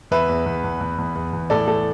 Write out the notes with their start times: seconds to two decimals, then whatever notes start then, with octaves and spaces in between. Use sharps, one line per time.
0.11 E2 B4 E5
0.29 E2
0.46 E2
0.64 E2
0.81 E2
0.98 E2
1.15 E2
1.33 E2
1.50 A2 A4 D5
1.68 A3 A4